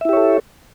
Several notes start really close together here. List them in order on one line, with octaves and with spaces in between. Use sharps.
E5 E4 G4 C#5 A4